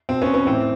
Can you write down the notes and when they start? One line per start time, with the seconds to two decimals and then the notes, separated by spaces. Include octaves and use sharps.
0.09 B2 C4
0.22 B3 C#4
0.34 B3 C#4
0.46 A2 E3 C4